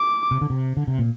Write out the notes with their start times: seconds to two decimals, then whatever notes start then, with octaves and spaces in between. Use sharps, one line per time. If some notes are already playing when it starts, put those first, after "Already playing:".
Already playing: D6
0.31 C3
0.41 D3
0.50 C3
0.77 D3
0.87 C3
0.98 A#2